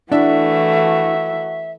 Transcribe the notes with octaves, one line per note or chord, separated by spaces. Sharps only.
E3 A3 D4 E4 F#4 E5